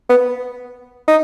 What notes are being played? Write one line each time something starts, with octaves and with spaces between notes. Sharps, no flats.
B3
D#4